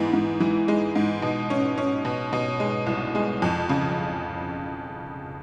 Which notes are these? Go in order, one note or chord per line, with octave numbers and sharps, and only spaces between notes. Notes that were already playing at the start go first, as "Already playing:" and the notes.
Already playing: G#2 E3 B3
G#2
E3
G#3
G#2
B2
C#4
C#4
B2
B2
G#3
C2
G#3
F2
C#3